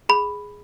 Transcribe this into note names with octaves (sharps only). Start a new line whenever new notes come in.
G#4 B5